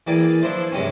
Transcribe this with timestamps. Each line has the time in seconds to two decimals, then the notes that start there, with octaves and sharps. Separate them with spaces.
0.07 E3 A#3 G#4 D5 G5
0.43 F3 D4 E4 C5
0.72 G2 C3 G#3 C4 C#4